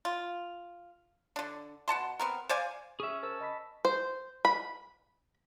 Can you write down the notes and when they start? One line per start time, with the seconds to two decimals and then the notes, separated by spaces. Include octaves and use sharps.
0.05 F4
1.36 D3 D4
1.88 B2 F#5 A5 C6
2.20 B3 C4 A#4
2.49 C5 D5 F5 G#5
3.00 C#4 G#4 E5
3.23 A#4 C5 A5 E6
3.41 D#5 B5 B6
3.85 C5
4.45 B5